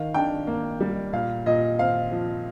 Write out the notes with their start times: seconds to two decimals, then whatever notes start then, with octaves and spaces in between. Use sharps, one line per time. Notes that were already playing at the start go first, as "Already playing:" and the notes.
Already playing: D#3 F5
0.14 D4 G5
0.47 A#3
0.80 G3
1.13 A#2 F5
1.46 A#2 D#5
1.79 C4 F5
2.12 F3